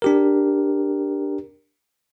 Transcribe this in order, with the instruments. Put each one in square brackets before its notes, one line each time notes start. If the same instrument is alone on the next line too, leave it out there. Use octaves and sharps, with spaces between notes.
[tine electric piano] D4 G4 A#4